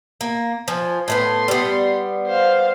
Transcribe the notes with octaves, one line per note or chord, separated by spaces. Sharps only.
A#3
F3 G#5
A2 A3 B3 C6
G3 B3
C5 F5